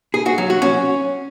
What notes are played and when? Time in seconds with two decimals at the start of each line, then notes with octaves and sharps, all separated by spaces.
0.14 G#4
0.26 F#4
0.38 F#3
0.50 F#4
0.62 C#4